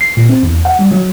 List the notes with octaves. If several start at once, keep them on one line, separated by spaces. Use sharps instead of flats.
C7
A#2
C4
E2
F#5
G3
F#3